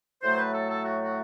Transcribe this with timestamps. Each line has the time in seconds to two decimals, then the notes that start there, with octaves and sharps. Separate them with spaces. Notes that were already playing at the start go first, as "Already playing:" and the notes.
0.23 A2 F#3 A3 C5
0.38 B4
0.54 A4
0.70 A4
0.85 F#4
1.02 F#4